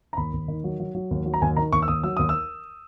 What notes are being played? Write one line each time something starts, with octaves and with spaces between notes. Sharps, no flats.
A#5
D#2 B5
D#2
D#3
F#3
F#3
F#3
D#2
F#3
A#5
D#2 G#5
D#3 A#5
D#2 C#6
E6
D#2 D#6
F#3 E6
D#2 D#6
E6